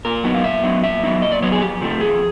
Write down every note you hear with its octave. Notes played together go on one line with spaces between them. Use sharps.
A#2 A#4
F#3 B3 D#4
F5
A#2 E5
F#3 B3 D#4
A#2 E5
F#3 B3 D#4
A#2 D#5
D5
F#3 B3 D#4 C#5
G#4
F2 G4
C3 F3 A3
F2 G#4